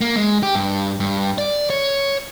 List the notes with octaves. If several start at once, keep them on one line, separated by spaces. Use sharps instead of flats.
A#3
G#3
G4
G2
G2
D5
C#5